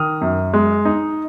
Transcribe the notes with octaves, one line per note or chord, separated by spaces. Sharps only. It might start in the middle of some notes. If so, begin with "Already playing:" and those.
Already playing: D#3 D#6 F6
F#2
G#3
D#4